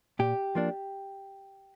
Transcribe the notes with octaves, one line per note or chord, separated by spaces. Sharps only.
A#2 G4
F3 A#3 D4